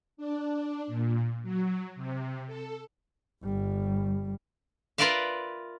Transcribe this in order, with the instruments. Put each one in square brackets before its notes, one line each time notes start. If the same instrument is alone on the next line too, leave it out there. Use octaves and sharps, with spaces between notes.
[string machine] D4
A#2
F#3
C3
A4
[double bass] G1 G3
[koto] F4 A#4 B4 D5 E5 F5